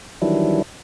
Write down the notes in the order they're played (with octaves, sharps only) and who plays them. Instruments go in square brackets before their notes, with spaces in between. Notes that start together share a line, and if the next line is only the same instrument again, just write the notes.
[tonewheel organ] D#3 E3 F#3 G3 D4 E4